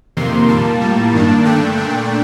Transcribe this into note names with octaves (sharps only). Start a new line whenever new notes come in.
F2 C3 D#3 A#3 C6
A#2 G3 A#3 A5
A2 G3 A#3
G2 D#3 A#3 D4
G2 D3 A3 D4 G5
A#2 A3 D4